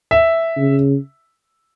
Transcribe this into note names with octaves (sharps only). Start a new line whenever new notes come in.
E5
C#3